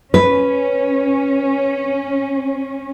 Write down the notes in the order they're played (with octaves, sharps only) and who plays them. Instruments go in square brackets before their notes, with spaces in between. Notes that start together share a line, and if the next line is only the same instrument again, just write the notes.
[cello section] C#4 [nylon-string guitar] B4